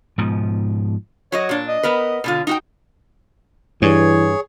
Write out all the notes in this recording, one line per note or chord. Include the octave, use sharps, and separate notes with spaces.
G#2 B2 F3
F#3 F#4 C#5 D#5
A#2 D4
D#5
B3 A#4 B4
B2 D3 F4
D#4 F#4 G5
G2 E3 G#4 C#5